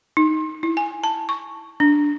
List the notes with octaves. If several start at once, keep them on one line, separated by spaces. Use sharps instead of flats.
D#4
E4
G#5
A5
C#6
D4